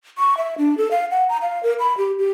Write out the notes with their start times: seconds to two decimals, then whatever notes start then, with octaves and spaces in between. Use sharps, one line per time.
0.18 C#6
0.37 E5
0.58 D4
0.78 A4
0.91 F5
1.11 F#5
1.29 A#5
1.42 F5
1.63 A#4
1.79 B5
1.98 G4
2.19 G4